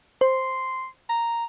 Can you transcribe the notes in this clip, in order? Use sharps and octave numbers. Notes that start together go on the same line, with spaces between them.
C5 C6
A#5